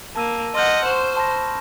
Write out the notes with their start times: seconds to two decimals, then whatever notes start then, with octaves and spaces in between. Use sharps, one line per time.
0.16 A#3 A5 E6 D#7
0.55 D#5 F#5 C6 F6 G6
0.85 C5 C#6 E7
1.17 A5 B5 A#6